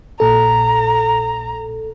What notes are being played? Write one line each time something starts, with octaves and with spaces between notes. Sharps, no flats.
A#1 A#2 A4 A#5